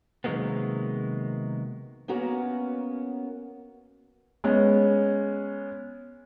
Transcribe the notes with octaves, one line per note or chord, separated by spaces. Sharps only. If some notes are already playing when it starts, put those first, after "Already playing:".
C3 D#3 F#3 G#3 A#3 B3
A#3 B3 C#4 F#4 A#4 F#5
G#3 B3 C#4